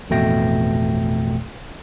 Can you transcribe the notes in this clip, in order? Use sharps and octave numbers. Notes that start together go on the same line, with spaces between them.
A1 F2 B2 A3 G5 A#6